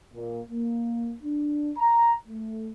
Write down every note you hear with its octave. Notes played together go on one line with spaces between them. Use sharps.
A#2
A#3
D4
A#5
A3